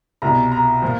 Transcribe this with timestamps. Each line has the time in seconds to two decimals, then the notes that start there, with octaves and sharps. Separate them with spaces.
0.22 C2 B2 A#5
0.52 A#5
0.82 A#2 F3